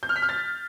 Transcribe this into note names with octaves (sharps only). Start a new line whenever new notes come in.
G6
F6
B6
F6
A6